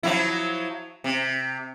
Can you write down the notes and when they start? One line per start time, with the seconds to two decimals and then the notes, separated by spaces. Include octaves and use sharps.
0.03 F3 F#3 E4
1.04 C3